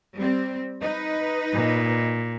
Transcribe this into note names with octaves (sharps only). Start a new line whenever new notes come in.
G3 C4
D#4 B4
A#2